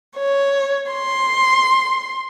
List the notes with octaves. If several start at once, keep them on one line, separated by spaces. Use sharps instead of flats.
C#5
C6